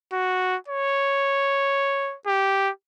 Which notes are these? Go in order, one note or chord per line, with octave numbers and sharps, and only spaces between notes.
F#4
C#5
G4